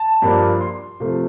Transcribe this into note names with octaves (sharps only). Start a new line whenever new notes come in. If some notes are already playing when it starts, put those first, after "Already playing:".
Already playing: A5
G2 F3 A#3 D4
C6
C3 F3 A3